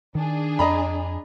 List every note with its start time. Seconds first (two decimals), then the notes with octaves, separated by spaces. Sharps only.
0.15 D#3 D4 G#4
0.59 F2 D#5 A#5 B5